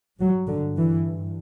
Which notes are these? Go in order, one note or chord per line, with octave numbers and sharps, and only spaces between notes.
G2 F#3
D3
E3